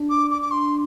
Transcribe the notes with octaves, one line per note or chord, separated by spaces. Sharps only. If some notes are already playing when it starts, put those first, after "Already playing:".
Already playing: D4
D6
D6
D6
C6